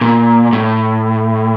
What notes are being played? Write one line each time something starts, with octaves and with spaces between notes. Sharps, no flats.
A#2
A2